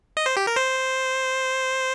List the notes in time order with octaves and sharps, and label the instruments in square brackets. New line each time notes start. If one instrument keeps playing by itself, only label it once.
[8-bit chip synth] D#5
C5
G4
A#4
C5